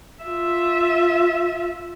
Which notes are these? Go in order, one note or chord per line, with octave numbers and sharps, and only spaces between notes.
F4 E5